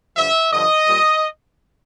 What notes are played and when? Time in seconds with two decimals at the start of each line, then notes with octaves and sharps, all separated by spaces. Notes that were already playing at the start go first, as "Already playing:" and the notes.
0.15 G2 D3 F3 E5
0.51 G2 D3 F3 D#5
0.87 A#2 G3